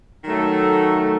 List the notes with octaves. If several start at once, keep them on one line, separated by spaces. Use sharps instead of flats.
D#3 F#3 A3